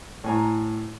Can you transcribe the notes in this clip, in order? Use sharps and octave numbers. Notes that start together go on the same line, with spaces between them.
A2 G#5 A#5